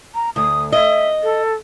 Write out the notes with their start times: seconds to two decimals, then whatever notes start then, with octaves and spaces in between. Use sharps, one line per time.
0.15 A#5
0.36 D2 D#6
0.72 D#5 E5
1.23 A4